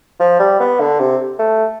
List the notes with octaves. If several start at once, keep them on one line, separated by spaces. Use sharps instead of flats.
F3
G3
B3
D3
C3
A3